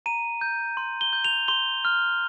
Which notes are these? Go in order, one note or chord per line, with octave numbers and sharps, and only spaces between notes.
A#5 D#7
G6
C6
G7
G6
F7
C6 G7
F6